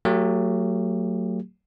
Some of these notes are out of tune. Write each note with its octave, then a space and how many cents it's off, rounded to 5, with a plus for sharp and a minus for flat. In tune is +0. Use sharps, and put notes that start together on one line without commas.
F#3 +0 A3 +35 G4 +25